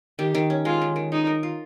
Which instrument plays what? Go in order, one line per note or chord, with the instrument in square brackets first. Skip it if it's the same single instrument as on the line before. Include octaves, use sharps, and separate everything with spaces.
[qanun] D#3 [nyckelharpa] G4
[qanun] D#3
C#4
[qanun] G#3 [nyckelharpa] F4
[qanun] D#3
D#3
[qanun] G#3 [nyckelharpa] D#4
[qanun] A#4
F4